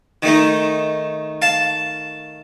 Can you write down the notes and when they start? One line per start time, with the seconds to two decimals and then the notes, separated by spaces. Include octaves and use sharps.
0.23 D#3 A3 D#4
1.42 F5 A5